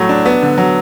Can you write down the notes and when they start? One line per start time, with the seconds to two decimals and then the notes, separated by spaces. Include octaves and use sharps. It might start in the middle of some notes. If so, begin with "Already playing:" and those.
Already playing: A2 F#3 A3
0.09 D4
0.26 B3
0.42 D3
0.58 F#3